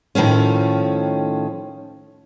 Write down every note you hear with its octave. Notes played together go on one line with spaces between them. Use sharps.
A2 D#3 F3 A3 C#4